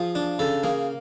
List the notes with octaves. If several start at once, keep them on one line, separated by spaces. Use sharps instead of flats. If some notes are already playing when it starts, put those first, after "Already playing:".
Already playing: F3 G#4
D4
C#3 A4
A#3 G#4